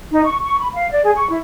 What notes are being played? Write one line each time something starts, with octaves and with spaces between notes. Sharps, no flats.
D#4
C#6
C#6
B5
F5
D5
G#4
C#6
E4